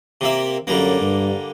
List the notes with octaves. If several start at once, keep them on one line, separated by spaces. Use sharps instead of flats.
C3 A#3 E5
F#2 D3 G3 A#3
G2